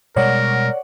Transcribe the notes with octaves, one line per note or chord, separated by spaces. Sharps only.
B2 G3 G#3 A#4 C#5 D5 F#5